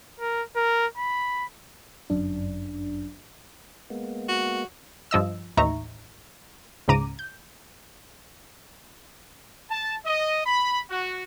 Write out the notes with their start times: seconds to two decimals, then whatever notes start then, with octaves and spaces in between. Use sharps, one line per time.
0.20 A#4
0.56 A#4
0.98 B5
2.10 G1 F#2 D4
3.90 G#3 A#3 B3
4.29 F#4
5.11 G2 F3 D#5 E6
5.57 A1 D#2 D#4 E5 A#5 C#6
6.88 C#2 G#2 C#3 A#5 D6 D#7
7.19 G6
9.70 A5
10.06 D#5
10.46 B5
10.90 F#4